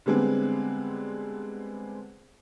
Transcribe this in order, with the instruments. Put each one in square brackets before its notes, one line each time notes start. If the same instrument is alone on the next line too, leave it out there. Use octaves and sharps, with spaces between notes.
[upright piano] D3 G3 G#3 B3 C4